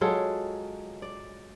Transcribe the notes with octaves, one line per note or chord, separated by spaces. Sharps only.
F#3 G#3 F4 A4
D5